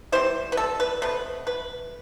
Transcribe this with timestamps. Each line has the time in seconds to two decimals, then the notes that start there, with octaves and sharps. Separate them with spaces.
0.12 E3 G3 C4 C5
0.52 B4
0.57 A4
0.80 B4
1.02 B2 A3 C4 B4
1.47 B4